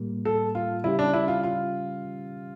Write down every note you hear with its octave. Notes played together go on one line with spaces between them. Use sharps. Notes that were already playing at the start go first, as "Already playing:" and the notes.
Already playing: A2 G3 A#3
A4
F4
C#3 G3 C#4 E4 G4
D4
E4
F4
F4